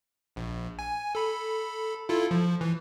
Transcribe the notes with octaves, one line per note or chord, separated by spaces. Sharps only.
A#1
G#5
A4 B5
E4 F4 A4
F3
E3